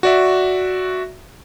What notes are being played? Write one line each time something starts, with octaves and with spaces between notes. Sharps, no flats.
F#4 D5 E5